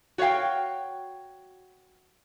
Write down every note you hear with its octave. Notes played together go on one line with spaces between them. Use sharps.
F#4 C#5 D5 F5 G5